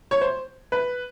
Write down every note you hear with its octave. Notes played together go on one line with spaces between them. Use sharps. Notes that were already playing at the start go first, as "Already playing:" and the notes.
C#5
C5
B4